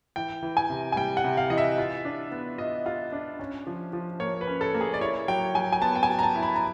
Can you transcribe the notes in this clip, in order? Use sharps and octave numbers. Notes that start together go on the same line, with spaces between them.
E3 G5
E3
G#5
C3
G#5
G3 G5
F#5
C3
F5
E3 D#5
E5
F4
D4
B3
F4 D#5
F4
D4
C#4
F3
F3
A#3 C#5
B4
C#4
A4
A#3
G#4
D5
E4 C#5
F#3 G5
F#3 G#5
G#5
B3 A5
G5
G#5
F#3
A#5
A5
E4
B5
A#5